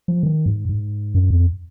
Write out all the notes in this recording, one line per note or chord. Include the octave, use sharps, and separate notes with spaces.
F3
D#3
G#2
G#2
F#2
F2